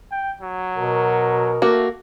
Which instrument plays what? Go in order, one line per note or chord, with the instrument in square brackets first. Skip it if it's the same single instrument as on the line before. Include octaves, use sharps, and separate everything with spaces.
[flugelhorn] G5
F#3
[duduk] B2 [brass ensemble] A#4
[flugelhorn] A3 [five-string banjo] A#3 F#4